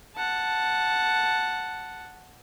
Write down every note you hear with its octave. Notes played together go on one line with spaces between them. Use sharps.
F#5 A5